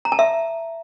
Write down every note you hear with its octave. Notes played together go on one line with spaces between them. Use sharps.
A#5
A5
E5